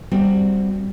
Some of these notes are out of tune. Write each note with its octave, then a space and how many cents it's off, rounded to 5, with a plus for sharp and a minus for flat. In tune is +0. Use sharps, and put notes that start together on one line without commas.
G3 +0 C4 +0 F#4 +0